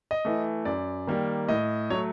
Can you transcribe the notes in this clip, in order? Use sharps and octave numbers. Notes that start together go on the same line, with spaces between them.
D#5
E3 A3
F#2 D5
D#3 G3 A#3
A2 D#5
F#3 A3 C#5